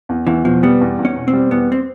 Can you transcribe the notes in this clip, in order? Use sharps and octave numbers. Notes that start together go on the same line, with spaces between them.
E2
E2 E3
B2 F3
G3 B3
E2
E2
C#4
B2
C4
G3
E2 B3
C4